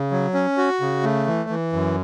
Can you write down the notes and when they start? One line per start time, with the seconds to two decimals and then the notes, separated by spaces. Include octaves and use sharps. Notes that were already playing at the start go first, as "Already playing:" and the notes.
Already playing: C#3
0.11 F#3
0.34 C#4
0.57 F#4
0.81 C#3
1.03 A3
1.27 E3
1.50 E3
1.73 F#2